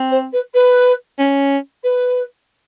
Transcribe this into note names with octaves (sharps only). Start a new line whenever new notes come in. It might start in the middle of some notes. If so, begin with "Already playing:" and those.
Already playing: C4
C5
B4
B4
C#4
B4